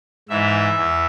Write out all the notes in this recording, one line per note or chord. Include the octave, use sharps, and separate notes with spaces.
G#2 E3 E5
E2